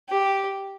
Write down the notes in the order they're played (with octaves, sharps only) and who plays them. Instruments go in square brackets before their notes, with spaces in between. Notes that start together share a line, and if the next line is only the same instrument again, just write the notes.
[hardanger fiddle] G4